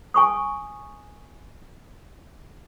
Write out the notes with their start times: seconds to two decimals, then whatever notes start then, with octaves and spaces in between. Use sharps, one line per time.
0.14 G#5 C#6 D#6